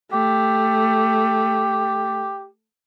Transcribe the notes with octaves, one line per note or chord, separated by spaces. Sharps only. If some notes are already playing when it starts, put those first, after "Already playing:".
A3 G4